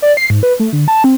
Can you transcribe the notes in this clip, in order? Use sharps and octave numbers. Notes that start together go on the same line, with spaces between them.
D5
C7
G#2
B4
A3
D3
A5
C4